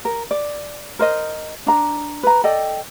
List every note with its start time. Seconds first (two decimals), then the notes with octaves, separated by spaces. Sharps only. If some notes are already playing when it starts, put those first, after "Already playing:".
0.05 A#4
0.31 D5
0.99 A#4 C5 D#5
1.66 D4 A#5
2.23 B4 A#5
2.44 A4 D5 D#5 G5